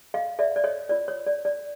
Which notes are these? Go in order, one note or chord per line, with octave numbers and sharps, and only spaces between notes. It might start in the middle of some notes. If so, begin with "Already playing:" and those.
D#5 F5
D5 E5
D5
C#5 D#5
F4 A#4 C#5 D5
C#5
D5
D5